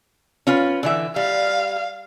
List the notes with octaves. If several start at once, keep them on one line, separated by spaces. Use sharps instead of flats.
C#4 F4 B4
D3 E3 E5
G3 F5